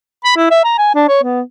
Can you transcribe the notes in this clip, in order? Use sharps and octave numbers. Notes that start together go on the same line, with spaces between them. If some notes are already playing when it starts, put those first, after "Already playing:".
B5
E4
E5
A#5
G#5
D4
C#5
B3